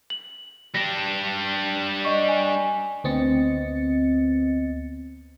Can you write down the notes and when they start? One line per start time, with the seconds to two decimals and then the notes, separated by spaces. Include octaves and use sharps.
0.10 F#7
0.74 G3 D4 A#6
2.05 D#5 C#6
2.29 G#5
3.04 D2 B3 C4 D#5 A6 C#7